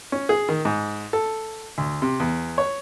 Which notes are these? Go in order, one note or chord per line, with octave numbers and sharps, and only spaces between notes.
C#4
G#4
D#3
G#2
A4
D2
C3
E2
C#5